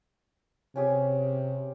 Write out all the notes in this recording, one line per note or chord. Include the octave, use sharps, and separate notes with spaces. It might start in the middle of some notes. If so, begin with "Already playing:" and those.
C3 C#4 G4 G#4